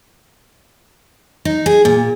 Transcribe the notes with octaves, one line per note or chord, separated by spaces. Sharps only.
D#4
G#4
A#2